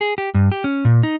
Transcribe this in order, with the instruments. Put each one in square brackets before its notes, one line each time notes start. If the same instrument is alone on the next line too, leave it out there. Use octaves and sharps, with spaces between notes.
[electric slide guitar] G#4
G4
G2
G4
C#4
A#2
D#4